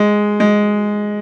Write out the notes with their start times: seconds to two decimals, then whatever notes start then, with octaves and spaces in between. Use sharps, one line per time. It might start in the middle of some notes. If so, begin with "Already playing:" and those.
Already playing: G#3
0.40 G#3